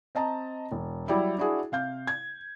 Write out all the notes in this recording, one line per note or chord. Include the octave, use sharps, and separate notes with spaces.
C4 D#5 A5 A#5
E1
F#3 G3 E4
D4 E4 F#4 G#4
C3 F5 G6
G#6